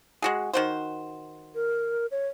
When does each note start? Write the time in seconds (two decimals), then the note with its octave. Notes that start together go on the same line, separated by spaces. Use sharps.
0.22 G#3 F#4 G#4
0.53 D#3 F#4 C5
1.55 A#4
2.11 C#5